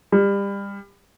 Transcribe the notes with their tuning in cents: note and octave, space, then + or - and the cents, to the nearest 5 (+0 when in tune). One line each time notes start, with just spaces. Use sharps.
G3 +30